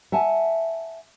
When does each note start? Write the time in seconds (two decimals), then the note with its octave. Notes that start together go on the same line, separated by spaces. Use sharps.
0.12 E5 F#5 G#5 A5